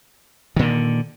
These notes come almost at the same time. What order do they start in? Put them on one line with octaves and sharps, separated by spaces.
D#3 A#2 D3